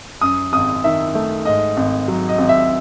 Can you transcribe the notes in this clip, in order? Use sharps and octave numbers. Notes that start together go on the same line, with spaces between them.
F#2 D#6
G#1 D#6
D#3 E5
A3
G#2 D#5
G#1
F#3
D#5
G#1
E5